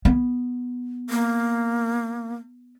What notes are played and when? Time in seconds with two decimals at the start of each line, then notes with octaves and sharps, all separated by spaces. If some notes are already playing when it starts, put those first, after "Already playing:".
0.05 B3
1.10 A#3